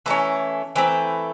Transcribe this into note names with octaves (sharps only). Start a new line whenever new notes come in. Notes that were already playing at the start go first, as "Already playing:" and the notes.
E3 A3 C#4 A#5
E3 A3 C4 A#5